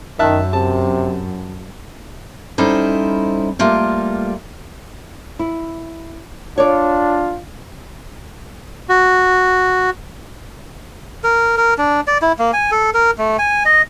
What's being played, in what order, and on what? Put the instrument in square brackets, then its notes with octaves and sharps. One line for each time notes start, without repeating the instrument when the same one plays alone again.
[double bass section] F#2 [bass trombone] D#3 [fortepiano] E5 A5 F#6
[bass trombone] C3 [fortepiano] A5
[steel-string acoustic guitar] G3 C#4 D#4 E4 A4 C5
G3 A3 A#3 F4
[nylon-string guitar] E4
[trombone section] D4 F4 [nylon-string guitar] C#5 D5
[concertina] F#4
[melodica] A#4
A#4
D4
D5
E4
A#3
G#5
A4
A#4
A3
G#5
D#5